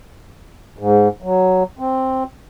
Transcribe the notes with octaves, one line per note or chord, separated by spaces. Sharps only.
G#2
F#3
C4